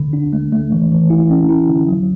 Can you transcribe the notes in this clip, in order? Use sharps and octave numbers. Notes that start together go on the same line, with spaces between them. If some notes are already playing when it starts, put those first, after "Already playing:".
Already playing: D3
D4
A3
A3
E3
E3
E4
C#4
E4
D3
F#3